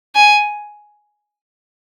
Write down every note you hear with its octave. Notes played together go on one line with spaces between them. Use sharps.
G#5